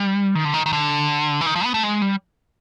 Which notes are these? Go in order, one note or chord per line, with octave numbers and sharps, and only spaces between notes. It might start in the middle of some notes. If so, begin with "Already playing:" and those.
Already playing: G3
D#3
D3
D#3
D#3
D3
E3
D#3
F3
B3
A3
G#3
G3